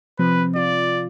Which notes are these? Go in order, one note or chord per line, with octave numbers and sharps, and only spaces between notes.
C3 F3 C4 B4
F4 D5